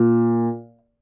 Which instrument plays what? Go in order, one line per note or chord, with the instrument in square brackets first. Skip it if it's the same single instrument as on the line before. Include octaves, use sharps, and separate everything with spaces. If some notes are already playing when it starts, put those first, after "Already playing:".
Already playing: [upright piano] A#2